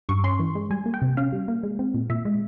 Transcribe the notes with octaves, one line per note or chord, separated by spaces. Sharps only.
G2 C#6
C#4 C6
E3
G#3
G3 G#5
A#3
G5
C3
C#4 F5
G3
A#3
G#3
C4
A#2
A#2 E5
G#3